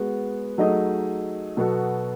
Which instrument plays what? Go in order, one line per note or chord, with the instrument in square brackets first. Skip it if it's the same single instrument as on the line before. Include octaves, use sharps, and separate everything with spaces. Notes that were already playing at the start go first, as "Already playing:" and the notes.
Already playing: [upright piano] G#3 B3 F#4
F#3 A3 D#4 G#4 D#5
B2 F#3 B3 F#4 A4